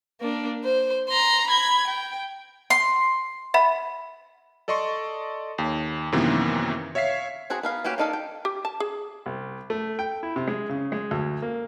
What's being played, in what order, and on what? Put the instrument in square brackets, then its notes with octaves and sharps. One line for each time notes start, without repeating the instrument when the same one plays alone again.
[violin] A#3 D4
C5
A#5 C6
B5 G#6
G5
[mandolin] C6
[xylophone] E5 F#5 B5
[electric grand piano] A4 D5 D#5 C6 C#6
D#2
F#2 C3 D#3 E3 A#3 B3
C#5 E5 F5 B6 C7
[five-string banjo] C4 F#4 G#4 F#5 A#5
B3 A#4 F5
A#3 C#4 F#4 G4 B4
A#3 D4 D#4 A4 F5
G5
[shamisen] G4
A5
G#4
[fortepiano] C2
A3
G5
E4
C3
G#3
C#3
G#3
D2
A#3